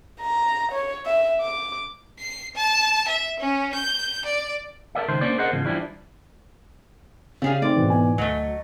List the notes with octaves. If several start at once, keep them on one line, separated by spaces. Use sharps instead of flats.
A#5
C#5
E5
D6
C7
A5
E5
C#4
G6
D5
A4 A#4 D5 E5
C#2 D#3 C5
A#3 C#4 D4 C5 D5
G#4 A#4 C5 D#5 F#5
E2 G#2 C#3 F3
E3 F3 G3 D4 E4
C#3 G3 G#4 F5
A3 C4 D#4 D5
G#2 B2 E3
B3 G#5
D2 F#3 A3 D#5